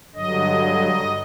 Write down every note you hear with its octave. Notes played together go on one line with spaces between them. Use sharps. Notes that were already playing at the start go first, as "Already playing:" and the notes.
G2 D3 F#3 D#5